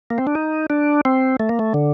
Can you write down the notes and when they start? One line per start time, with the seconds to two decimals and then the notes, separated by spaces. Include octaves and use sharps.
0.10 A#3
0.18 C4
0.27 D4
0.35 D#4
0.70 D4
1.05 C4
1.40 A3
1.49 A#3
1.59 A3
1.74 D3